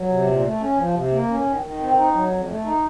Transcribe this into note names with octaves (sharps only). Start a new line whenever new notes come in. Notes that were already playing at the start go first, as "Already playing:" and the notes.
Already playing: F#3
C3
A#2
A3
C#4
F3
C3
A#3
C#4
D#3
D#3
C4
D#4
F#3
F2
A3
D#4